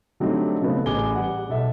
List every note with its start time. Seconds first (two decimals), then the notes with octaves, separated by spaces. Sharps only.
0.20 D3 F#3 G3 A3 C4 D#4
0.62 C#3 F#3 A3 B3 C4
0.86 A1 G#4 G#5 D6 G7
1.15 G3 F#5
1.49 B1 A4 E5